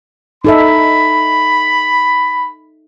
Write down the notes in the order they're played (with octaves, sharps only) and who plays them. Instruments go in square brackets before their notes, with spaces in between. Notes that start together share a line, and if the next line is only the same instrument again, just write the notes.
[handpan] D#4 A4 E5 [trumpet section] B5